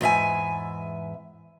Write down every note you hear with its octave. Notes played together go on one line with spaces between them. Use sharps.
E2 G#2 E5 G#5